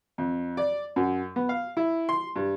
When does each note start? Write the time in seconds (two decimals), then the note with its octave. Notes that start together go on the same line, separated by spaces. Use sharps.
0.18 F2
0.57 D5
0.96 F#2
1.36 B3
1.49 F5
1.77 E4
2.09 C6
2.36 G2